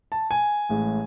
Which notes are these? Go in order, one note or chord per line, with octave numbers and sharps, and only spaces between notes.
A5
G#5
A1 A2 G#3